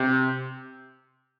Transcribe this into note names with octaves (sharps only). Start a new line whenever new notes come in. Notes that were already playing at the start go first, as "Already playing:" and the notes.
Already playing: C3